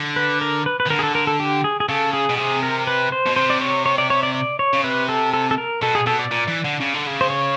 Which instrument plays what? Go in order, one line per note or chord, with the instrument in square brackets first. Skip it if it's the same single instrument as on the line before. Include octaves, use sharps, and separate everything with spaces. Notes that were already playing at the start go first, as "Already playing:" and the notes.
Already playing: [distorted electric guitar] D3
[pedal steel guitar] B4
A#4
B4
B4
[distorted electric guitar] D#3
[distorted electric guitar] D3 [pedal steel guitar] A#4
[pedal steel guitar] G#4
A4
A#4
A4
G4
G#4
G#4
[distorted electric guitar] C#3 [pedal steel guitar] A4
[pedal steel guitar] G#4
[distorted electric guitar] B2
[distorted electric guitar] C3 [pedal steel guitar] G#4
[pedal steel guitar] A#4
B4
C5
[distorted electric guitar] B2
[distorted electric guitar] C3 [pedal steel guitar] C5
[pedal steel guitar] D5
C#5
C#5
D5
C#5
D5
D5
C#5
[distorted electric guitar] C#3
[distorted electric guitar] C3 [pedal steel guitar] B4
[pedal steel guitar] A4
A4
A4
A#4
[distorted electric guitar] B2 [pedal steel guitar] A4
[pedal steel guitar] G#4
[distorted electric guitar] B2 [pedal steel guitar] A4
[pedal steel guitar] D5
[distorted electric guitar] A#2
E3
D3
C#3
D3
C#3
[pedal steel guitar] C5
C#5